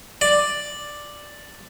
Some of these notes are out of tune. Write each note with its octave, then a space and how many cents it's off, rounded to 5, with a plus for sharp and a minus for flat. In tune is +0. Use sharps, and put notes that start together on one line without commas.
D5 +5